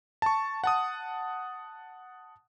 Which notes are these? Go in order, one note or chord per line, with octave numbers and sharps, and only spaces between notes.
A5 C#6
F#5 A5 D#6